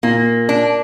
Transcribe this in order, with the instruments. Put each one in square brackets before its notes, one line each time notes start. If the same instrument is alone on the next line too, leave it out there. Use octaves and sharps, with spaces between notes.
[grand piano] A#2 [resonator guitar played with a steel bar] A#3
[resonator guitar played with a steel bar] D4